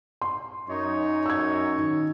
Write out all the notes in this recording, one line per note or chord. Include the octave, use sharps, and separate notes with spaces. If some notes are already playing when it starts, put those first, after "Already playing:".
C6
F#2 D#4 C#5
E6 G#6
D#3